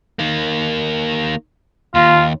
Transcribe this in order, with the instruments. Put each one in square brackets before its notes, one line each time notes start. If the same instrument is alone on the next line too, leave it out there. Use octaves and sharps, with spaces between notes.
[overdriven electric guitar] D#3 A#3
[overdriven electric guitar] D#2 [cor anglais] F4